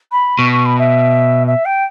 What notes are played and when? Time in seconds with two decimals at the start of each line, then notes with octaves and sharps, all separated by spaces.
0.12 B5
0.38 B2 C#6
0.52 C#6
0.65 B5
0.79 E5
1.47 E5
1.65 G5